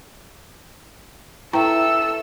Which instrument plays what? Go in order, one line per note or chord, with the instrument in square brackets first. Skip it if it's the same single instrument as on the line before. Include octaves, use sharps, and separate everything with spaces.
[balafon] E4 G5 A#5 [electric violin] A4 E6 [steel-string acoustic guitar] B4 E5